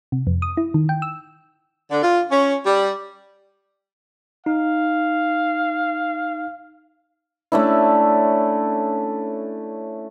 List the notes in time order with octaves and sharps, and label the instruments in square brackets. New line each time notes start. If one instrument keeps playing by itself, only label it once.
[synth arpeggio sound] C3
F2
D#6
E4
D#3
G5
E6
[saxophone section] D3
F4
C#4
G3
[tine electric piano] D#4 [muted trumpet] F5
[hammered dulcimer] A3 C#4 D4 E4